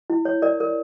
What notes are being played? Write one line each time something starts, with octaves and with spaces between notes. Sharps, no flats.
E4
C#5
A#4 D5
A#4